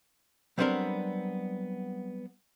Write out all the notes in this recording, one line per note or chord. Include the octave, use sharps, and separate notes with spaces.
F#3 G3 B3 C4 D4 A#4